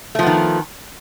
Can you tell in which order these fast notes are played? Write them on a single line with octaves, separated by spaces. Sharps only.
A3 F3 B3 D#3